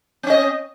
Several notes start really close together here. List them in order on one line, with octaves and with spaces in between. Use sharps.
C4 C#4 D#5